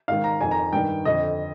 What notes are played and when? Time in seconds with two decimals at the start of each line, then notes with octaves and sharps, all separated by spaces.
0.08 G#2 D#3 F5
0.24 A#5
0.41 F2 D#3 G#5
0.51 A#5
0.73 G2 D#3 G5
1.05 F2 D3 D#5